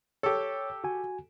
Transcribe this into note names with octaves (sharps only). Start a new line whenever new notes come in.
G4 A4 C#5
F#4 G#5